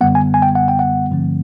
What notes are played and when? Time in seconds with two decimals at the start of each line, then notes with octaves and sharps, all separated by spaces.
0.01 F#2 D3 G3 B3 F#5
0.15 G#5
0.34 G#5
0.42 G5
0.55 F#5
0.68 G5
0.79 F#5
1.11 G2 D3 F3 A3 C4